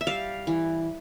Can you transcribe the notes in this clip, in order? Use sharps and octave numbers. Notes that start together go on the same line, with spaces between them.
E5
G3 F5
E3